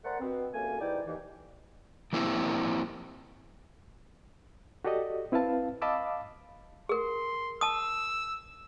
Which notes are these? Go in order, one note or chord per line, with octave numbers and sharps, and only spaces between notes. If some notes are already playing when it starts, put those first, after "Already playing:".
A3 A#4 C5 D5 F#5
G2 B2 B3 C4
C#2 F#2 A3 A#3 G#5
G#2 E3 G3 D#4 D5 G5
D#2 E3
F3 A#3 C4 E4 G4
F#4 G4 A4 D5 D#5
C4 E4 B4 F5 A5
D#5 F5 A5 B5 D6 E6
G#4 A#4 C6
A5 D#6 E6